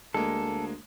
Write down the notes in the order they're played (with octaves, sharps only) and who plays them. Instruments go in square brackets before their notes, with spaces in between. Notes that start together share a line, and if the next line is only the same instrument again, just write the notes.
[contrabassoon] D2 [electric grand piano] G#3 A#3 [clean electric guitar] A4